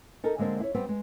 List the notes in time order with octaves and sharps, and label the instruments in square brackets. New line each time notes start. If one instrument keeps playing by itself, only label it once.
[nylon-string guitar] D#4 A4 A#4
D3 G#3 A#3 C4 D4
E4 C#5
G3 B3 C4 G4
G#3